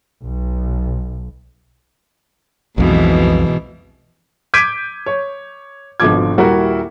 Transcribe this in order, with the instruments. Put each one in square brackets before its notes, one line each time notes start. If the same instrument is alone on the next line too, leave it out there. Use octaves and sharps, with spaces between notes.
[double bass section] B1
[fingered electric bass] B1 F2 [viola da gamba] G#2 B2 E3
[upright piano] D6 G6 G#6 B6 D7 D#7
C#5
G#1 B2 D3 F3 D6 G#6
D#1 G3 E4 F#4 A#4 E5